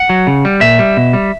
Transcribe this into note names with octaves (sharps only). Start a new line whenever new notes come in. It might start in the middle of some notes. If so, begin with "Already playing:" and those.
Already playing: F#5
F#3
C#3
G3
A#2 E5
G3
B2
G3